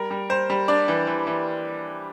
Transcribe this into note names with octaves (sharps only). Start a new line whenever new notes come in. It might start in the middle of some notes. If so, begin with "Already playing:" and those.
Already playing: G3 A#4
G3
G3 C5
G3
D4 D5
E3
E3
E3